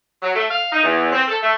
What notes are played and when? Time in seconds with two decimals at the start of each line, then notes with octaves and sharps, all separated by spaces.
0.22 F#3
0.34 A3
0.50 F5
0.72 D#4
0.84 E2
1.13 C4
1.28 A4
1.42 A3